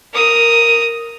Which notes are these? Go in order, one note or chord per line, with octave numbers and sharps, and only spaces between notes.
A#4 D#6